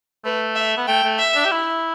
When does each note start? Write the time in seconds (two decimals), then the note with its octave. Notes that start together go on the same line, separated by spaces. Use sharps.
0.24 A3 B4
0.56 E5
0.77 B3
0.88 A3 G5
1.03 A3
1.19 E5
1.35 D4
1.45 G4
1.51 E4